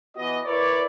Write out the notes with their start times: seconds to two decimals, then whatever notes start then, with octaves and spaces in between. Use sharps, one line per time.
0.16 E3 B3 F#4 D#5
0.45 E4 A#4 B4 C#5 D5